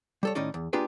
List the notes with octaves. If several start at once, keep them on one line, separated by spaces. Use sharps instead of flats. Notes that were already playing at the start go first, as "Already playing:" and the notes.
G3 A4 C#5
A2 D#3 C#4 D#4 D5 D#5
E2
A#3 D4 F4 G4 G#4 B4